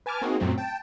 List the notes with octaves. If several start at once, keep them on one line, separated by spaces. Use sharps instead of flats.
B4 G#5 A5 D6 F6
A#3 C4 D#4 F#4 G#4
F#2 A#2 F#3 A3 C4
G5 A5